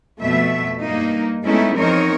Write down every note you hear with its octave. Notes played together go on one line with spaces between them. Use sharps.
F2 B2 A3 E5
G2 A#3 D#4
G#3 A3 B3 C#4 D#4 E4
E2 F3 C4 D#4 A#4 C#5